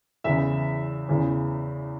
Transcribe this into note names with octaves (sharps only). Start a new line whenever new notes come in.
E2 C#3 E3 E5
E2 C#3 E3